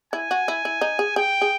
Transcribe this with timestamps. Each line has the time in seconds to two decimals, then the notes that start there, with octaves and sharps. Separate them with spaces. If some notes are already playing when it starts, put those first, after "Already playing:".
0.13 E4 G#5
0.31 F#4
0.48 E4
0.65 E4
0.81 D#4
0.99 G#4
1.16 G#4 G5
1.41 G#4